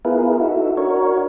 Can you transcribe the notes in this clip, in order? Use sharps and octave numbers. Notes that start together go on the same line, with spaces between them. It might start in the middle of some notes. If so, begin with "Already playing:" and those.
B3 E4 F4 G#4 A#4 B4
D#4 E4 F#4 A4
D4 F#4 A#4 C#5